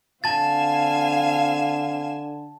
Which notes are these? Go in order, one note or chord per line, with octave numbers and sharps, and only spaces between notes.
D3 C4 F5 G#5 A5 A6 E7